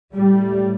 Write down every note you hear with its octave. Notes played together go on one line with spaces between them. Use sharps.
A2 G3